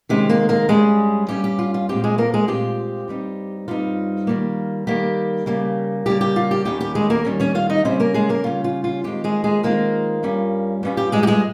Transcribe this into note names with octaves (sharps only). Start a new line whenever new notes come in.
C3 D#3 G#3 C#4 G4
A#3 A#4
A#3 A#4
G2 G3 G#3 C#4 G#4
G2 G3 C#4 G4
G4
F4
F4
A#2 G#3 C4 F4 G4
G#3 G#4
A#3 A#4
G#3 G#4
A#2 G#3 C4 F4 G4
G2 G3 C4 D#4
G2 G3 C4 D#4 F4
D#3 G3 A#3
D#3 G3 A#3 G4
C#3 G3 A#3
C#3 G3 A#3 G4
G4
F4
G4
D#2 D#3 G3 C#4 G4
G4
G#3 G#4
A#3 A#4
D#2 D#3 G3 C#4
C#4 C#5
F4 F5
D#4 D#5
C#3 G3 C4 C#4 C5
A#3 A#4
G#3 G#4
A#3 A#4
C#3 G3 C#4 F4
F4
F4
D#3 G#3 C4 F4 G4
G#3 G#4
G#3 G#4
D#3 G#3 A#3 C4 F4 A#4
G2 G3 C#4 F4
G2 G3 C#4 F4
G4
G#3 G#4
G4
G#3 G#4